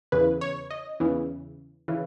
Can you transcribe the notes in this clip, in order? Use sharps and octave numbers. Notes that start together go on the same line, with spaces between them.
E2 C#3 E3 B4
C#5
D#5
E2 C#3 E3
C#3 E3